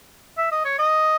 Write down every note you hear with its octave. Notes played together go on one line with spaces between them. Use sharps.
E5
D#5
C#5
D#5